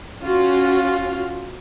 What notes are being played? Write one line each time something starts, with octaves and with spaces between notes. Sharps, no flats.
C#4 F4 F#4